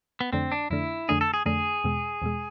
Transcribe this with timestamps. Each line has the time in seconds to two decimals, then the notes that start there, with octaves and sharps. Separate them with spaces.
0.21 B3
0.33 F2 D3 A3 C4 D4
0.52 D4
0.70 F2 D3 A3 D4 E4
1.09 F2 D3 A3 D4 G#4
1.21 A4
1.34 G#4
1.46 F2 D3 A3 D4 G#4
1.84 E2 B2 G#3
2.22 E2 B2 G#3